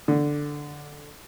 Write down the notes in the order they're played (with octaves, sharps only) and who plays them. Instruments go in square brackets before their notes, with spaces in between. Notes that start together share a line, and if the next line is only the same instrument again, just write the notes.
[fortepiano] D3